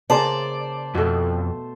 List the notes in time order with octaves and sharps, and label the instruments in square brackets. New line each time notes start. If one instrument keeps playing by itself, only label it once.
[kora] C#3 A#3 [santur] C5 A5 [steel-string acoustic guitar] D5
[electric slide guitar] F2 [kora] B2 A3